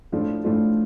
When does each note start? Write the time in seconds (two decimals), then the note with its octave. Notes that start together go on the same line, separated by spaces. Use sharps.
0.12 A2 F3 A3 D4 F4
0.44 A2 F3 A3 D4 F4